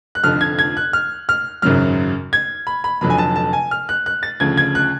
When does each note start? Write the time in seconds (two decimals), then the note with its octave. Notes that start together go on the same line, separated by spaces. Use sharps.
0.15 F#6
0.24 F1 F2 D3 F3 F6
0.41 G#6
0.59 G#6
0.77 F#6
0.93 F6
1.29 F6
1.62 G#1 F#2 C#3 F#3 F6
2.33 G#6
2.67 B5
2.84 B5
3.01 F1 F2 D3 F#3 B5
3.10 G#5
3.18 A5
3.36 A5
3.53 G#5
3.71 F6
3.89 F#6
4.06 F#6
4.23 A6
4.40 D2 C#3 F3 G#6
4.57 G#6
4.75 F#6